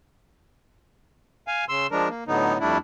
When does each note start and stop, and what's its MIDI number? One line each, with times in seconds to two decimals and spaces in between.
1.48 1.65 77
1.48 1.65 80
1.69 1.87 49
1.69 1.87 84
1.69 1.87 88
1.92 2.08 53
1.92 2.08 56
1.92 2.08 62
1.92 2.08 70
2.09 2.24 58
2.28 2.58 45
2.28 2.58 50
2.28 2.58 54
2.28 2.58 59
2.28 2.58 63
2.60 2.78 41
2.60 2.78 55
2.60 2.78 57
2.60 2.78 62
2.60 2.78 64